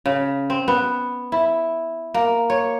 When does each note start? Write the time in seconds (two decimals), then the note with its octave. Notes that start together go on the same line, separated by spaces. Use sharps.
0.06 C#3
0.50 C4
0.68 B3
1.32 E4
2.14 A#3
2.50 C#5